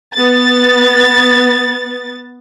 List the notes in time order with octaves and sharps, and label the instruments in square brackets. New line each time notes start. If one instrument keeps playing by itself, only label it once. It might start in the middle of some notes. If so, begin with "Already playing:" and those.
[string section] B3 A6